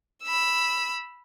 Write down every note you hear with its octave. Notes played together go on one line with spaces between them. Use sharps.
B5 E6